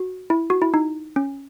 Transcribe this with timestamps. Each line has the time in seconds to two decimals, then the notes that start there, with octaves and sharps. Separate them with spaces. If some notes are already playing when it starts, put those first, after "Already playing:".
Already playing: F#4
0.30 E4
0.50 F#4
0.62 E4
0.74 D#4
1.16 C#4